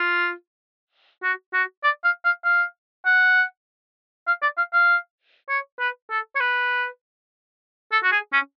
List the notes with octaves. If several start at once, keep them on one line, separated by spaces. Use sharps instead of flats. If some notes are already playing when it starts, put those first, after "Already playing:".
Already playing: F4
F#4
F#4
D5
F5
F5
F5
F#5
F5
D5
F5
F5
C#5
B4
A4
C#5
B4
A4
F#4
G#4
C#4